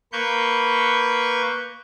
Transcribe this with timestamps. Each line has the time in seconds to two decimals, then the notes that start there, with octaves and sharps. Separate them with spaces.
0.12 A#3 B4 C#6 G6